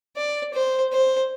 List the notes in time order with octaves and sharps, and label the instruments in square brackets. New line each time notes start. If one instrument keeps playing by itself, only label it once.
[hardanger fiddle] D5
C5
C5